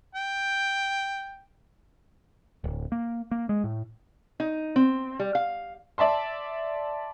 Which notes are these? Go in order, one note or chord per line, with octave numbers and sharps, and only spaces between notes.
G5
D1
A#3
A#3
G#3
A2
D#4
C4
G3
F5
D5 E5 A5 C6